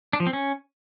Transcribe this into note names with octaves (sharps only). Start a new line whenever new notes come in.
D4
F3
C4
C#4